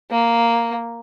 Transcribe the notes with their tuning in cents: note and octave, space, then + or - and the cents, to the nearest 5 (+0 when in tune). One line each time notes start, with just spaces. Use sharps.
A#3 +0